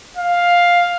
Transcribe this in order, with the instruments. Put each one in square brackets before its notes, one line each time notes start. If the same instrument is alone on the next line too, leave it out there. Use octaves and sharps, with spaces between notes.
[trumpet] F5